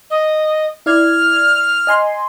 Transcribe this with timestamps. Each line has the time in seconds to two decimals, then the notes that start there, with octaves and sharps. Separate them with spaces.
0.10 D#5
0.86 E4 D5 F6 G#6
1.87 D#5 G#5 C6